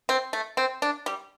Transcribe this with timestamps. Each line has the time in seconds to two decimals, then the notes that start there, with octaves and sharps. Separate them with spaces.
0.09 C4
0.33 A3
0.57 C4
0.82 D4
1.06 G3